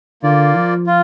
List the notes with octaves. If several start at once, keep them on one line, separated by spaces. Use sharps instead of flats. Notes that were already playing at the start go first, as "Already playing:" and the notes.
D3 A#3 F4 D5
F3
F4